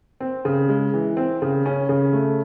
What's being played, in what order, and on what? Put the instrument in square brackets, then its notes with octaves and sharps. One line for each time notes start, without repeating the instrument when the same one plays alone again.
[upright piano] C4
C#3
G#3
E3
C4
C#3
C#4
C#3
A3